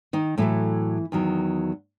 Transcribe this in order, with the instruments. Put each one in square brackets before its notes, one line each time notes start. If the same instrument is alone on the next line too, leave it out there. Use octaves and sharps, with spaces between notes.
[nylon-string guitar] D#3 D#4
A2 E3 F#3 A3 E4
E2 D#3 F#3